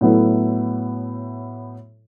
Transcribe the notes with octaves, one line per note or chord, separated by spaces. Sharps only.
A2 F#3 B3 E4 A4